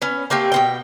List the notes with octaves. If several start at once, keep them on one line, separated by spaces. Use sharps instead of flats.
B3 C#4
A3 A#3 C4 G4
B2 C4 G5